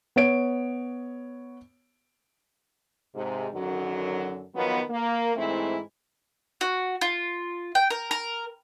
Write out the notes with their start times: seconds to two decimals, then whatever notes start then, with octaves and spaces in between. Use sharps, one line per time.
0.16 B3 C#5 D7
3.15 G#2 C3
3.52 F#2 D3 D#3 F#3
4.55 D#3 F3 F#3 B3
4.90 A#3
5.36 G#2 E3 A3 C4 E4
6.61 F#4
7.01 F4
7.75 G5
7.90 A#4
8.11 A#4